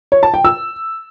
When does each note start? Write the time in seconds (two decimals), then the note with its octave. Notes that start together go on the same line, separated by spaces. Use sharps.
0.12 C#5
0.23 A5
0.34 G5
0.45 E6